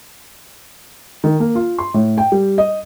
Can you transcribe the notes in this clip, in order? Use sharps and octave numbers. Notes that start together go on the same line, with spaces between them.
D#3
A#3
F4
C6
A2
G5
G3
D#5